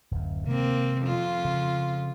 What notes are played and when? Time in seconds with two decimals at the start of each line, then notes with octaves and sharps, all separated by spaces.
0.11 D1 F#2
0.47 C3 D#3 G#3 A#3 C4
1.03 F2 F4
1.45 C#3